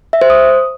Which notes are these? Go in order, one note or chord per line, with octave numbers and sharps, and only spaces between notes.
E5
C5
D#6